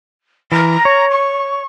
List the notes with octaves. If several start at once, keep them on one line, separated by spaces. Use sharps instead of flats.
E3 A#5
C#5
C#6